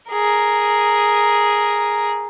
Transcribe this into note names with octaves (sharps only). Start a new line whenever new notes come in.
G#4 A#4